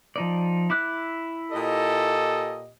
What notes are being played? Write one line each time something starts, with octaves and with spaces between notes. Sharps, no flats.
F3 D#4 D5
E4 D6 F#6
A#2 G4 A4 D#5